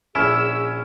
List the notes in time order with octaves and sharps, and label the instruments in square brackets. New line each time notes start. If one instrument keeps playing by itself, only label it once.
[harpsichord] A#1 E4 [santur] C#4 [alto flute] G#4 [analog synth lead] E6